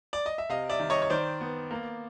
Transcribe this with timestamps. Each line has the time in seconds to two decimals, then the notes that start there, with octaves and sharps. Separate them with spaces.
0.13 D5
0.26 D#5
0.38 E5
0.49 C3 D#5 F5
0.70 D5 E5
0.80 D#3
0.90 C#5 D#5
1.02 C#5
1.10 D#3 C5 D5
1.41 B3
1.71 A#3